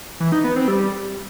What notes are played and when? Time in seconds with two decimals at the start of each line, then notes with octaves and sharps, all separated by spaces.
0.20 E3
0.32 D#4
0.44 B3
0.56 C4
0.68 G3